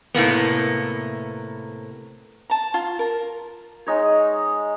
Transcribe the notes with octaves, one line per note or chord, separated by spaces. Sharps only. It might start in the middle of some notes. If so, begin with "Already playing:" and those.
A2 C3 A#3 B3
A5 A#5
F4
A#4
G#3 D#4 C#5